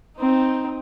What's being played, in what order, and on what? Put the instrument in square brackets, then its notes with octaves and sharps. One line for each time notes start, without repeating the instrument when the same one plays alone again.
[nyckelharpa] C4 D#4